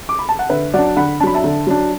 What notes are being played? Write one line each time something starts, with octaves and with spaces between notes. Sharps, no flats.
D6
B5
A5
F#5
D3 B4 E5
F#3 D4 D5 F#5
D3 F#5 B5
F#3 D4 A5 B5
E5 A5
D3
F#3 D4